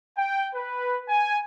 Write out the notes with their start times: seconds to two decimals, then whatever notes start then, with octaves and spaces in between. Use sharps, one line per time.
0.17 G5
0.53 B4
1.08 G#5